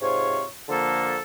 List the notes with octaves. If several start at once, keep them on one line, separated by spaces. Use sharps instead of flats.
G#2 C3 F4 C#5
D3 F3 A#3 A4